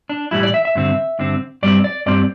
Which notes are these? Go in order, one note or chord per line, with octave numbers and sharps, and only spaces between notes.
D4
A2 E3 G3 E4
D5
E5
E5
G2 D3 C4
G2 D3 C4
G2 G3 C4 D5
D5
G2 G3 C4 D5